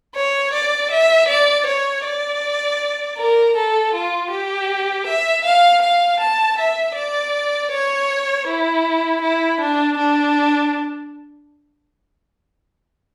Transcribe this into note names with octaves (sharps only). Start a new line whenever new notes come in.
C#5
D5
E5
D5
C#5
D5
A#4
A4
F4
G4
E5
F5
F5
A5
E5
D5
C#5
E4
E4
D4
D4